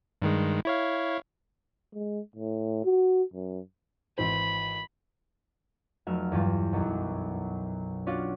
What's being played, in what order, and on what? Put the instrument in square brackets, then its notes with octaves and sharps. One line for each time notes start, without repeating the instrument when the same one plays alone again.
[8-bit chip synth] G2 D#3 G#3
E4 C#5 F5
[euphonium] G#3
A2
F#4
F#2
[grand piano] G#1 E3 C5 [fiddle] B5
[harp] F1 F#3 E5 F6
E2 G2 F4
B1 F#2
C#4 D4 F4 F#4